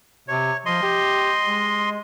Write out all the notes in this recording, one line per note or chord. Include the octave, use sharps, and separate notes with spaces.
C3 C#5
F3 D#5 C6
G4
G#3